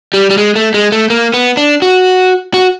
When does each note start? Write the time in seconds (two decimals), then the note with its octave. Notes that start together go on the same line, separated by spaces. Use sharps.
0.14 G3
0.30 G3
0.38 G#3
0.56 A3
0.74 G#3
0.92 A3
1.10 A#3
1.34 B3
1.57 D4
1.82 F#4
2.54 F#4